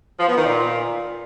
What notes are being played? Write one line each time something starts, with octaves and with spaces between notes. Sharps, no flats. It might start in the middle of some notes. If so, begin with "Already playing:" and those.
F3
B3
D#3
A#2